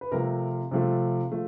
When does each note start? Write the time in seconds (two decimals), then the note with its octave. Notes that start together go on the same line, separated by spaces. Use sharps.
0.01 B4
0.12 C3 F3 A3 A#4
0.71 C3 F3 A3
1.32 F3 A3